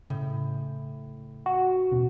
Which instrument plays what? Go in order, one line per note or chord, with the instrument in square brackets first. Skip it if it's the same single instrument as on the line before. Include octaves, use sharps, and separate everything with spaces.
[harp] A2 [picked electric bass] C#3
[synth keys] F#4
[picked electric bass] E2 B2 C#4